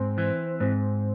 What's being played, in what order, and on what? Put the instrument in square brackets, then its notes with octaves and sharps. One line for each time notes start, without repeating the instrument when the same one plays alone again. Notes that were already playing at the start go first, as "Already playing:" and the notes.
Already playing: [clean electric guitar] G#2 [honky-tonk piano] C4
[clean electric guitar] E3
[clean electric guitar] G#2 [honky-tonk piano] C4